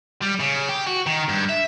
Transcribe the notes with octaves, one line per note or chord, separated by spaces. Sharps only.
G3
C#3
G4
F#4
D#3
G2
E5